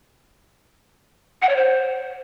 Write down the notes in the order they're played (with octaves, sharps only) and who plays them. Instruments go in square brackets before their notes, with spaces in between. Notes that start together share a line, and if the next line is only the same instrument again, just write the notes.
[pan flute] F#5
C#5
C5